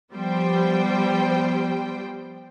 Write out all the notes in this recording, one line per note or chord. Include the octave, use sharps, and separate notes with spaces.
F3 G3 B3 C5 G5